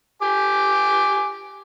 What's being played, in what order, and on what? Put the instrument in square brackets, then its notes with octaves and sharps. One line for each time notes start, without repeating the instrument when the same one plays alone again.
[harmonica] G4 G#5 D6